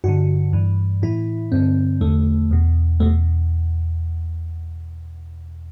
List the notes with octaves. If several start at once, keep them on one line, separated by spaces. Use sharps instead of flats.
G2 D3 F#4
G2 E3
A2 E3 E4
G2 D3 C4
E2 D3 A3
E2 B2
E2 B2 A3